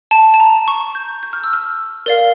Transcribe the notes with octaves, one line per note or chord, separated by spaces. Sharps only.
A5
A5
A#5
C#6
G6
G6
F6
E6
F6
A#4 D5 F5